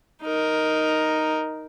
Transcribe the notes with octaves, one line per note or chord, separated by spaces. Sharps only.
D#4 A#4